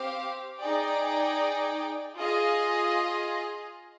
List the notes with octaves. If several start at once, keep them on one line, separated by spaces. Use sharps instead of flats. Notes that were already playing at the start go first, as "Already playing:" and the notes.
Already playing: C4 G4 C5 F5
D#4 G#4 D5 G5
F4 G#4 D#5